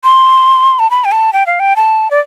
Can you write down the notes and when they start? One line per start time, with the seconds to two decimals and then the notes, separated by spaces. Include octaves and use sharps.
0.04 C6
0.79 A5
0.91 B5
1.05 G5
1.12 A5
1.33 G5
1.46 F5
1.60 G5
1.76 A5
2.11 D5